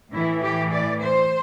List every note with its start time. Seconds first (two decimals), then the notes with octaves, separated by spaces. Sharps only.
0.12 A2 E3 E4
0.41 G4
0.71 D5
1.01 C5